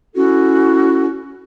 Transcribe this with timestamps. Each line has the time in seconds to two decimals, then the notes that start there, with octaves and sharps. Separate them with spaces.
0.15 C#4 E4 F#4 A4